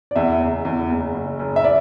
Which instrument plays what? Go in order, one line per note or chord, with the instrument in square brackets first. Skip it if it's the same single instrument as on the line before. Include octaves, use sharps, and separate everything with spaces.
[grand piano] D5
[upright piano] E2 [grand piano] E5
[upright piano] F#1
E2
F#1
F#1
F#1
[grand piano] E5
D5